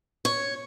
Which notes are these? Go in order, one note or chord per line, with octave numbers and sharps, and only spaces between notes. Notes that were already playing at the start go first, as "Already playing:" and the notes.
C#5